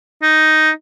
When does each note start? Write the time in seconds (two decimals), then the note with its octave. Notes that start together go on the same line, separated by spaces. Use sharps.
0.22 D#4